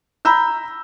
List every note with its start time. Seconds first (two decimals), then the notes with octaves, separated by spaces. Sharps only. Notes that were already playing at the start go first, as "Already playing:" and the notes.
0.25 A#5 B5 E6 G6